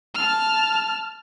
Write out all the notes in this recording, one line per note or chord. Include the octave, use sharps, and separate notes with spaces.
A5 F6